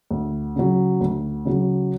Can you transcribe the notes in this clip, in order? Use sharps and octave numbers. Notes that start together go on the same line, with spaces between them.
D2
C#3 F#3
D2
C#3 F#3